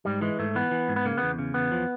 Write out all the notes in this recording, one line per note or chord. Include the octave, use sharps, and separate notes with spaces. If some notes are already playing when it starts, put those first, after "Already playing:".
G#2 G3
E3 G#3
G#2 A3
E3 B3
E3
G#2
B3
C#3 A#3
E2 B3
C#3
E2 B3
F3